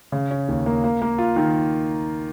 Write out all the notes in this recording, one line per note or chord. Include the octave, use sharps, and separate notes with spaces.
C#3
C#4
D#2
A#3
A#3
A#3
F4
D#3